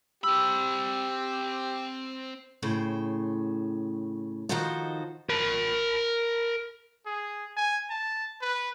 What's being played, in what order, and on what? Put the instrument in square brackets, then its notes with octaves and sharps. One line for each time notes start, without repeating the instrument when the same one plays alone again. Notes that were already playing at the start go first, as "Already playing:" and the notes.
[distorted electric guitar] C4 B5 [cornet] G4 [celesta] E6
[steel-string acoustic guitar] A2 C#3 C5 G5
D#3 F3 D#4 F#4 A4 C5
[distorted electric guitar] A#4 B5
[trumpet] G#4
G#5
A5
B4